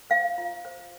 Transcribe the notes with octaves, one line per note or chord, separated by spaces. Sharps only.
C5 F5
F4
C5